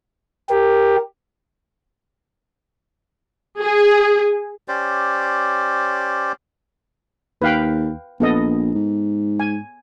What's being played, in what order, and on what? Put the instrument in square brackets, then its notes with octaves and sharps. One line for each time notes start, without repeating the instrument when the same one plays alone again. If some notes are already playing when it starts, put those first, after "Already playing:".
[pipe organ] G4 [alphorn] A#4
[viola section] G#4
[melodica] C#4 G4 C5 D5
[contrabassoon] D#2 [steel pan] B4 F5 G5
[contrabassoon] A#1 [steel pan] B3 A4 D#5
[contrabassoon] G#2
[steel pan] G#5